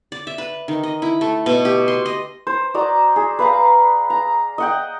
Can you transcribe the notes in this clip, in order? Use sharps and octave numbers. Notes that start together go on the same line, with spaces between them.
D5
E5
B4
D#3
D#5
E4
A3
B2
G4
C6
D#5
C5
F#4 D5 D#5 A#5
G#4
B4 F5 A#5
A#5
D#5 F#5 G5